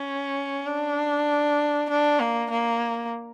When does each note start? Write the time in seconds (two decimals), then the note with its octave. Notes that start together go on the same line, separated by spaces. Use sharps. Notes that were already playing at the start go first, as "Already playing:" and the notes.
Already playing: C#4
0.66 D4
1.90 D4
2.20 A#3
2.51 A#3